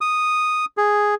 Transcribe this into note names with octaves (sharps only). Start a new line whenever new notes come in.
D#6
G#4